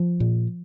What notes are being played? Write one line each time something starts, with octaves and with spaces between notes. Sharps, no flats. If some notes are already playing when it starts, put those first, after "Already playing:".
Already playing: F3
A#2